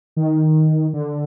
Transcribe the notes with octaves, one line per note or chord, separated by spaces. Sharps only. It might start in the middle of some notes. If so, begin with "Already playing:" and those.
D#3
D3